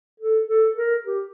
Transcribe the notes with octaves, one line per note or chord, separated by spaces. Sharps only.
A4
A4
A#4
G4